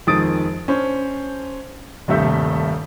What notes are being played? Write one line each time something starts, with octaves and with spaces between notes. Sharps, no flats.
F2 D#3 G#3 D#6 A6 D7
C#4 D4 C5
D#1 G2 C3 A3 E5 G6